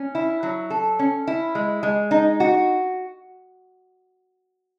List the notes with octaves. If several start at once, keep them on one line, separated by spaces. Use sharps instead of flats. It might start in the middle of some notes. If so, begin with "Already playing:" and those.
Already playing: C#4
E4
F#3
A4
C#4
E4
G#3
G#3
D#4
F#4